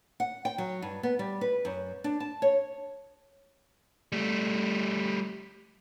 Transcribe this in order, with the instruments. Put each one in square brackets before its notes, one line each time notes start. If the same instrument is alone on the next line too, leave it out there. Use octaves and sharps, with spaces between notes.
[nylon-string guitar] F#5
G5
F#3
G2
B3
G3
B4
F#2
D4
A5
C#5
[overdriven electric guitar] G3 A3